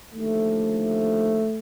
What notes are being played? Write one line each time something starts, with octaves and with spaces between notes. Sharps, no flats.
D#2 D3 F3 A3